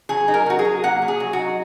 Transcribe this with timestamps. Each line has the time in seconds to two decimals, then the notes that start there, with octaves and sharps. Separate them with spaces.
0.09 F#3 G#4
0.28 D#4
0.34 A#4
0.46 F#3 F#4
0.59 G#4
0.65 F#3
0.83 A#3 F#5
1.02 F#3
1.08 G#4
1.20 F#3
1.33 F#4
1.39 D#4